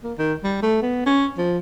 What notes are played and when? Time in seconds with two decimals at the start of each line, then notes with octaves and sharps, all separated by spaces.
0.04 A#3
0.18 D#3
0.44 G3
0.62 A3
0.82 B3
1.06 C#4
1.38 F3